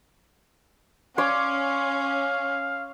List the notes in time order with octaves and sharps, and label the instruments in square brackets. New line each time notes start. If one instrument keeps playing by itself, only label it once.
[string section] C#4 [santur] C#5 C6 D6 [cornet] F5